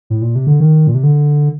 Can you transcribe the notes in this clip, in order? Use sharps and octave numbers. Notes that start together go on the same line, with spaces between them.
A2
A#2
C3
D3
D#3
A#2
C3
D3